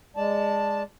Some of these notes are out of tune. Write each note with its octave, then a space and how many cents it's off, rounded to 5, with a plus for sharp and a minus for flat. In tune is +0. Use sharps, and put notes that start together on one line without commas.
G#3 -10 D5 +0 A5 +0